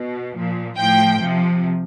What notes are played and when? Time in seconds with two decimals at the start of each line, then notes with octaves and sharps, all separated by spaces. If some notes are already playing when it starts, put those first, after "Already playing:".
Already playing: B2
0.34 A#2 F3
0.77 A2 F3 G5
1.21 C3 F3